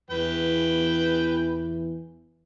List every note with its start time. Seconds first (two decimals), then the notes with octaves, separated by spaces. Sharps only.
0.10 E2 E3 B4 G5